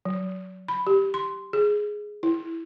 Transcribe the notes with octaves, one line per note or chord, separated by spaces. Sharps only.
F#3
B5
G4
C6
G#4
E4